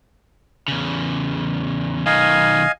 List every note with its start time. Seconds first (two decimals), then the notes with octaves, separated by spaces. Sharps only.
0.68 E2 C#3
2.06 B1 D#3 D#5 F5 G#5